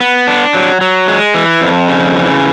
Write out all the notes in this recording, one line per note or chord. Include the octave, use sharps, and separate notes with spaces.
B3
D4
F#3
F#3
G#3
E3
F2
C#3
E3